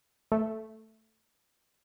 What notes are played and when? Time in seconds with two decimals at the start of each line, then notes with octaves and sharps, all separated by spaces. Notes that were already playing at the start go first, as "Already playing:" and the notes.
0.32 A3